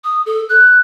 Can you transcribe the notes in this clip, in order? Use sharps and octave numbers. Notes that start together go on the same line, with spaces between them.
D#6
A4
F#6